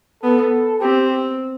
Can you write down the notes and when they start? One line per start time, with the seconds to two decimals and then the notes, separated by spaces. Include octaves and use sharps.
0.23 B3 A4
0.80 C4 G4